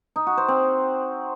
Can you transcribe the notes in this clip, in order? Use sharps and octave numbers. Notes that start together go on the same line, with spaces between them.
D#4
F#4
C5
C4